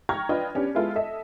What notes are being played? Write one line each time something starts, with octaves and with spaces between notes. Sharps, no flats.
G5 A#5 C#6 F6 G#6 A#6
D4 F4 B4 D#5 G5
B3 C#4 D4 G4
G#3 B3 E4 F4 A4
A4 D#5 E5